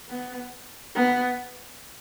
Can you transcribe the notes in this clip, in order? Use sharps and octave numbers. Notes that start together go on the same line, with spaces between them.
B3
B3